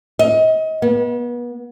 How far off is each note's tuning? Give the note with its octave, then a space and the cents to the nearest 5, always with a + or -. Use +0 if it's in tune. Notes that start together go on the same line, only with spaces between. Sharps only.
D#5 +30
B3 -35